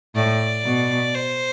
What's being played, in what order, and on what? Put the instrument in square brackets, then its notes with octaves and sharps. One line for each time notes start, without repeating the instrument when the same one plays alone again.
[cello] A2 [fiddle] D5
[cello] B2
[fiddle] C5